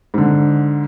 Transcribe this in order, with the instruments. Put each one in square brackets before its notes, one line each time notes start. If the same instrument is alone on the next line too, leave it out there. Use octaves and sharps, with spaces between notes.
[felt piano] G#2 D3